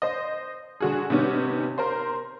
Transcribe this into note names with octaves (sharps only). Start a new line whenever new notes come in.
C5 D#5
D3 F#4 G#4
C3 D#3 B3 C#4
A#4 C5 C6